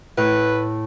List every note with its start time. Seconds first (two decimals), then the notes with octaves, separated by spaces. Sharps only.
0.17 A2 B4